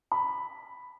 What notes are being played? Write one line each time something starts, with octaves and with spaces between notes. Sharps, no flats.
B5